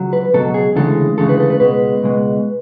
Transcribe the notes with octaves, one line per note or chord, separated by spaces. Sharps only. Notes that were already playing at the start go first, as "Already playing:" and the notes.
Already playing: C#2 F#3
B4
C#2 B2 F#3 A4
G#4
D2 C#3 E3 G#3 A4
D2 C#3 E3 G#3 A4
B4
A4
B4
C#2 B2 G#3 B4
C#2 B2 G#3